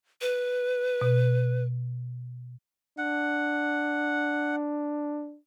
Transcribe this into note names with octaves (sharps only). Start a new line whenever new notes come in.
B4
B2
D4 F#5